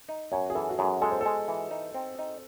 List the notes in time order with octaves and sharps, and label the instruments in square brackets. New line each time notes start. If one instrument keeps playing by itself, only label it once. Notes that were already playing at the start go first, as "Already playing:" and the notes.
[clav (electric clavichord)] D#4
[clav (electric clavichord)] F#2 [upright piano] C#5
[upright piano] G#4
[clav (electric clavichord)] E3 [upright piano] A4
[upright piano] F#4
[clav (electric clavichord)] F#2 [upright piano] G#4
[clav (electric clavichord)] G#3 [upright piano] A4
[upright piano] C5
[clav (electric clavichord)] G#3 [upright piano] A4
[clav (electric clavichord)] E3
D#4
C4
D#4